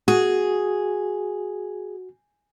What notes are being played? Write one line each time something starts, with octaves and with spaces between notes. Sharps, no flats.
F#4 G#4